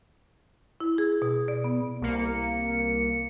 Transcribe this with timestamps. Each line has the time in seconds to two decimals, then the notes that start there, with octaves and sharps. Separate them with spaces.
0.80 E4
0.98 G#4
1.22 B2
1.48 D5
1.64 B3
2.01 C2 A#3 C#7